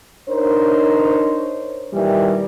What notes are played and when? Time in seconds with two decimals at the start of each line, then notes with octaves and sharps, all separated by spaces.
0.29 D4 D#4 A#4 C5 C#5
1.93 A#2 D#3 E3 G3